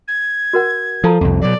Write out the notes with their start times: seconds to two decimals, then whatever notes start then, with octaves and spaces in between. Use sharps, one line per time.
0.08 G#6
0.53 F#4 A#4 F#5
1.04 F3 A4 A5 A#5
1.21 C2 F2
1.41 B2 F#3 D5